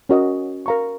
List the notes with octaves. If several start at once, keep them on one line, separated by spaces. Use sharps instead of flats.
C#4 F#4 A#4 D#5
A#4 F5 A#5 C#6